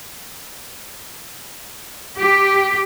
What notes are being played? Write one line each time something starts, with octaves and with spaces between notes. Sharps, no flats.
G4